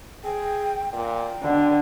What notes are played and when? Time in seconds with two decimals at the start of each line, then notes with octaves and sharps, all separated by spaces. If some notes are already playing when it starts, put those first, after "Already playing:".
0.24 G#4 G5
0.93 A#2 G5
1.43 B2 D3